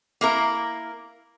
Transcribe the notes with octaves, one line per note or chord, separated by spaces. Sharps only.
A#3 E4 A#4